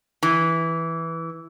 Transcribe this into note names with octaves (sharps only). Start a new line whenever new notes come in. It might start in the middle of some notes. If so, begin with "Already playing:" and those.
E3